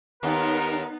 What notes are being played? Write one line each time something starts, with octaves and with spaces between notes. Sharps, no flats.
D#2 B3 D#4 A#4